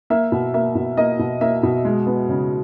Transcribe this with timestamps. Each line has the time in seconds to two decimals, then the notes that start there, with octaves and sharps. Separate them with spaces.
0.10 A#3 E5
0.32 B2
0.54 A#3 E5
0.75 B2
0.97 A#3 D#5
1.19 B2
1.41 A#3 E5
1.63 B2
1.85 G#3
2.06 B3
2.29 C#3